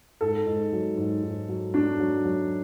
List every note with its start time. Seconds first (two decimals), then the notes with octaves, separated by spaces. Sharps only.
0.21 G#2 A4
0.46 G#2
0.72 F#3
0.97 G#2
1.23 G#2
1.48 F#3
1.74 F#3 D4
1.99 F#3
2.24 F#3